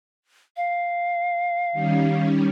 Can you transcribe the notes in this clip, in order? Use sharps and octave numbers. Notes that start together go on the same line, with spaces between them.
F5
D#3 G3 C#4